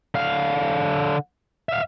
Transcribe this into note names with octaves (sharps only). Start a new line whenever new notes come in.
D3 F5
E5 F5